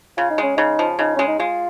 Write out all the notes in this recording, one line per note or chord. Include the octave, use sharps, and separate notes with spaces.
C#3 F4
D#4
G#3 C#4
C#3 D#4
F3
C#3 D#4
G#3 C#4
D#4
G#3 F4